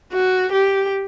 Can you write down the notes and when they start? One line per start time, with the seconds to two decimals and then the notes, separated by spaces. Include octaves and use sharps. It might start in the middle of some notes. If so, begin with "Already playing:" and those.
0.13 F#4
0.52 G4